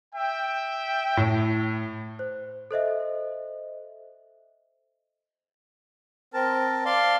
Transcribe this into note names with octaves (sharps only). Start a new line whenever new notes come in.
E5 G5
A2
C5
A4 C5 D#5 E5
C4 A#4 A5
D5 F5 A5 C6